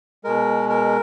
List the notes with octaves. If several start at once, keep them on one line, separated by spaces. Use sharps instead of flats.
B2 G#3 A#4
A#4